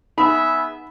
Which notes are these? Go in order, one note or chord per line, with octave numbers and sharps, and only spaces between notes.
B3 D#4 G#4 E5 B5